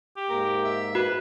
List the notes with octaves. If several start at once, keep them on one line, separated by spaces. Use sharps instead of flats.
G4
G#2 A#3 A#4
E5
F#4 B4